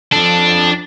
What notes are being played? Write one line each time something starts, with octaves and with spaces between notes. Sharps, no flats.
F3 D4 A4